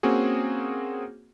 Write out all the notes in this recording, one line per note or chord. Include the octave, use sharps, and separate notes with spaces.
A#3 C4 C#4 F#4 G#4